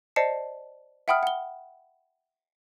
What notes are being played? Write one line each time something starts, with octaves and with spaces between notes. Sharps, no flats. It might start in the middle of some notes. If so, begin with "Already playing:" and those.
C5 D5 D#5 A5 C7 C#7
E5 F#5 G5 B5 D#6 F6
F#5 G7